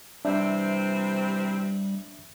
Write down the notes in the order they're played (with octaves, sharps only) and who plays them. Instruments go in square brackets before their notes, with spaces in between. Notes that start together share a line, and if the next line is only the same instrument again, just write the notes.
[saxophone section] C3 E3 C4 [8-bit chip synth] G3 [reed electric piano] D4 E5